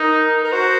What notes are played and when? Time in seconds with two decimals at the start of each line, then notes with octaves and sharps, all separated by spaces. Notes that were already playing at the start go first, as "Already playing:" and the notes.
Already playing: D#4 A#4
0.44 A#4
0.52 F#4 C5